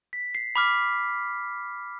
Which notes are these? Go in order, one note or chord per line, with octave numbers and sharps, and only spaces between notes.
B6
C7
B5 D6 F6 B6